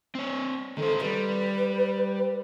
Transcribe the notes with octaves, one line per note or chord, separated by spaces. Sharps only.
C4 C#5
D#3 A4 C5
G3 B4